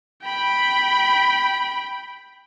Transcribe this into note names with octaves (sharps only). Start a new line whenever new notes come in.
G5 B5